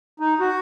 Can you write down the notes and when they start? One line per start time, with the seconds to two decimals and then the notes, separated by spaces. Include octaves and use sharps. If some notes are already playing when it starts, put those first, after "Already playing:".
0.20 D#4
0.40 F#4